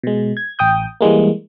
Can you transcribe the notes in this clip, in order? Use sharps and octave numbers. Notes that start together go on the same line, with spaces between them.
B2 G#3
G#6
A1 G5 D#6 G6
E3 G3 G#3 A#3